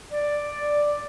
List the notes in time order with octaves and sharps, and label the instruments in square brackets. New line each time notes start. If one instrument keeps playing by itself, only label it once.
[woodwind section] D5